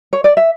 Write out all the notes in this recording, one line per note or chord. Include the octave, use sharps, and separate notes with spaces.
C#5
D5
E5